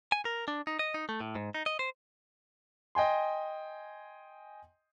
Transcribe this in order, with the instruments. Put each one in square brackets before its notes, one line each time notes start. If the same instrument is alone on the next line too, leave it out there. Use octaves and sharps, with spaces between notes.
[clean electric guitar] G#5
A#4
D4
D#4
D#5
D#4
A3
A2
G#2
D#4
D#5
C5
[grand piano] D#5 G5 G#5 C6